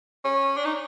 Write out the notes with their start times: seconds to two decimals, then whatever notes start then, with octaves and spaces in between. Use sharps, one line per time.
0.24 C#4
0.57 D4
0.64 D#4